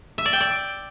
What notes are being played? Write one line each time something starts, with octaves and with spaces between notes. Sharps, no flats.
E5
D5
G5
D5